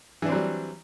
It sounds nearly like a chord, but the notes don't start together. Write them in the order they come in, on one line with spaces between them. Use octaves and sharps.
E3 D4 C4 F#3 G3